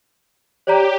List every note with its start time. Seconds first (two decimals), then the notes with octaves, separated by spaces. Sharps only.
0.67 G4 C#5 D5 A#5